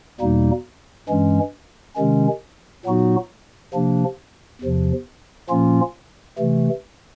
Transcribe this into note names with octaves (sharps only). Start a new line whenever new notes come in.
E2 B2 G3 A#3 D#4
G2 E3 G#3 C#4
C3 D#3 G#3 C#4
A#2 F#3 B3 D#4 F#4
C3 F3 A#3 D4
E2 C3 F3
A#2 F3 A#3 C#4 F4
C3 E3 A3